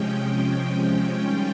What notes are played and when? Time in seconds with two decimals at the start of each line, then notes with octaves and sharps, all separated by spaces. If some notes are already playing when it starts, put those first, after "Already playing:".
Already playing: C3 F3 G#3 C#4 G5
0.41 G5
1.16 D#3 G3 C#4 F4